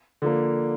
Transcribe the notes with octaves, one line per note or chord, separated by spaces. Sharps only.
D3 F3 A#3